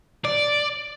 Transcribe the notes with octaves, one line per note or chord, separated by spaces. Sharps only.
D5